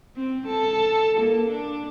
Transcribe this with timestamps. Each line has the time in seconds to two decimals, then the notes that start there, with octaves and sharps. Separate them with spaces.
0.16 C4
0.47 A4
1.19 A#3
1.49 D4